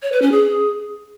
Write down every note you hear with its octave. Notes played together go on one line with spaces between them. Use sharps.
C#5
B4
C#4
G#4